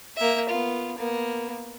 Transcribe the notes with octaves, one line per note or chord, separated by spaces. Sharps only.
A#3 E5
B3 F4
A#3 B3